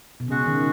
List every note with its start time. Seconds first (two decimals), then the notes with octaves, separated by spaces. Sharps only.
0.20 B2
0.28 C#3 G#3 C#4 F#4
0.46 D#3